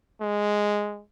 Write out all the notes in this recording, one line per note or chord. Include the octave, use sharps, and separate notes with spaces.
G#3